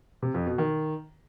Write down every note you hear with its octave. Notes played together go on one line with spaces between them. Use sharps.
C3
F2
B2
D#3